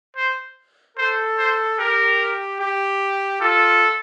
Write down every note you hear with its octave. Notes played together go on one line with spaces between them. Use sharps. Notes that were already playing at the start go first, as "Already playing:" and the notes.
C5
A4 C5
C5
G4 A#4
G4
F4 A4